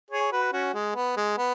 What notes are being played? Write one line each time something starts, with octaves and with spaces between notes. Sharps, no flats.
G#4 C#5
F#4 B4
C#4 F#4
G#3
B3
G#3
B3